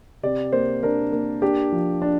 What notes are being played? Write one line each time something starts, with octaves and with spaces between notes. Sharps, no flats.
C3 D5
A#3 C5
D4 A#4
A#3
D4 G4
F3
D4